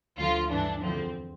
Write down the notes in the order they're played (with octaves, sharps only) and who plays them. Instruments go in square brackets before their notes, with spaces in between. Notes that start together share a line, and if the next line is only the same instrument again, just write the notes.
[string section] D2 D3 F3 F4
G2 E3 D4
E2 D3 F3 C4